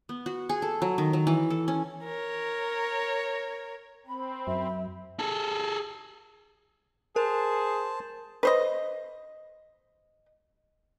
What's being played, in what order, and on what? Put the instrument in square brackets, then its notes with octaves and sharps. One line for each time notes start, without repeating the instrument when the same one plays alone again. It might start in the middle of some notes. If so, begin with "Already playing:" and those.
[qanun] B3
F#4
G#4
A4
F#3
D#3
F#3
E3
A4
C#4
[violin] A#4 C#5
[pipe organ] C4 [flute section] B5
[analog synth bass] F#2 [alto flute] E5
[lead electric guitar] G#4 A4
[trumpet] G#4 [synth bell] A#4 [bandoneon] C5 A5
[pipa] B4 C5 D#5